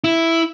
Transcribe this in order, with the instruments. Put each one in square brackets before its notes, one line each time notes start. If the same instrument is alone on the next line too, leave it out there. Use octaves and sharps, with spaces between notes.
[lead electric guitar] E4